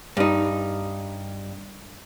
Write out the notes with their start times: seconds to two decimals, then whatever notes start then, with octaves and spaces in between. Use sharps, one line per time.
0.17 G2 D#4